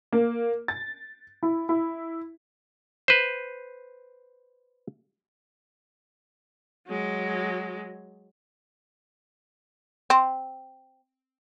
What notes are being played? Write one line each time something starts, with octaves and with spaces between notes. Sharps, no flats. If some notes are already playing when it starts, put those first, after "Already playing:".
A#3
A6
E4
E4
B4 C5
F#3 G#3
C4